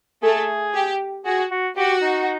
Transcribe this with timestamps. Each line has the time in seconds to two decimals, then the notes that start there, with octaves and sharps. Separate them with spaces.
0.22 A3 G#4 A4
0.74 G4
1.25 F#4 G#4
1.51 F#4
1.76 F#4 G4
2.02 D#4